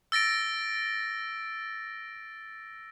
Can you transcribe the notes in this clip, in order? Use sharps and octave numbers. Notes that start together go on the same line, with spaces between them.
E6 A6 A#6 D7